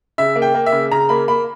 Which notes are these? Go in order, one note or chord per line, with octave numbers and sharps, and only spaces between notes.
C#3 E5
A#3
G5
A#3
E5
C#3
C#3 A#5
A#3 B5
A#3 B5